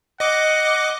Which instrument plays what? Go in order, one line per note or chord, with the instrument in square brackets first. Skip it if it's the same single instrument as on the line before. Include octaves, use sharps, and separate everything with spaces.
[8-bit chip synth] D#5 D6 [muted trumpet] F#5